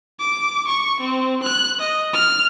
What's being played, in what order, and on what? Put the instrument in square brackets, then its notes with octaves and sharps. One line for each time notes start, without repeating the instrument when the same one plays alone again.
[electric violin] D6
C#6
C4
F#6
D#5
F6